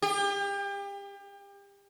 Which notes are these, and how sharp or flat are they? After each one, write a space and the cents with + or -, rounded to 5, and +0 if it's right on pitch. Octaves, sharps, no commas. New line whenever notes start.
G4 +35